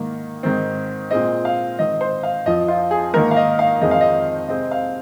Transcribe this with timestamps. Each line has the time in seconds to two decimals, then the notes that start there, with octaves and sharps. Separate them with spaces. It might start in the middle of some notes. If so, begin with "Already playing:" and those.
Already playing: G#2 D#3 A#3
0.43 G#2 D#3 C4
1.11 A#2 G#3 C4 D#5
1.45 F5
1.79 G#2 D#3 C4 D#5
2.01 C5
2.23 F5
2.46 F2 F3 C4 D#5
2.68 F4
2.91 G#4
3.14 G#2 D#3 A#3 A#4
3.31 F5
3.37 D#5
3.59 F5
3.81 F2 D#3 G#3 C4 D#5
3.91 F5
4.01 D#5
4.49 C3 G#3 C4 D#5
4.71 F5